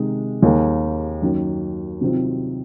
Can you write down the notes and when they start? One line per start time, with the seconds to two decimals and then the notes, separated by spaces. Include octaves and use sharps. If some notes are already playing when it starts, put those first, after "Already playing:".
Already playing: C3 D#3 G#3 D#4
0.42 D#2 D#3 A#3 D#4 G#4
1.22 F#2 D#3 A#3
2.01 C3 D#3 F#3 C4 F4